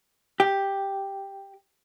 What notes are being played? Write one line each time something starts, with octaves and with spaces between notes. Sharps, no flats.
G4